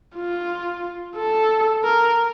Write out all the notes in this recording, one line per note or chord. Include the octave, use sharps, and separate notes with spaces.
F4
A4
A#4